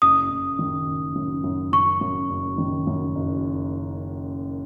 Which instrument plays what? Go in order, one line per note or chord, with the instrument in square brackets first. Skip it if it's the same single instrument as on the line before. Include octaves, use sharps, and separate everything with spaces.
[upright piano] F#1 [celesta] D#6
[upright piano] F#1
D#3
F#1
F#2
F#2
[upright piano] F#2 [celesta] C#6
[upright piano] F#2
F#1
D#3
F#2
F#1